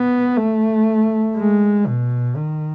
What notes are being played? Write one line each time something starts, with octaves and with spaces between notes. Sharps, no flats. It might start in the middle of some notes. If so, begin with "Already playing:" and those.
Already playing: B3
A3
G#3
B2
D#3